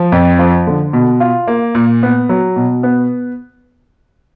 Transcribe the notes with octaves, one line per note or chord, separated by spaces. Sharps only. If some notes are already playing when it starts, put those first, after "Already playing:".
Already playing: F3
F2
F3
D3
B2
F4
A#3
A#2
B3
F#3
B2
B3